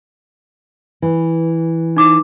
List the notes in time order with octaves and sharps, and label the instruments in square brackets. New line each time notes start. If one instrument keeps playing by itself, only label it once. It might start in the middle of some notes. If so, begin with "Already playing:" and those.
[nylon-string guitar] E3
[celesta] D#4 D6